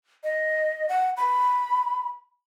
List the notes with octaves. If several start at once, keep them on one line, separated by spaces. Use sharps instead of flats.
D#5
F#5
B5